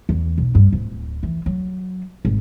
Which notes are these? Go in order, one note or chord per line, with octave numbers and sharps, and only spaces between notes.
E2
B1
G2
D1
E3
F#3
G#1